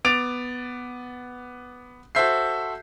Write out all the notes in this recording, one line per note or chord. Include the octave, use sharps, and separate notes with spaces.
B3 D6 A6 D7 F7
F#4 A4 C5 E5 G6 C7